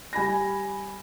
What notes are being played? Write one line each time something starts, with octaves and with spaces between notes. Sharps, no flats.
G3 G#5 B5 A#6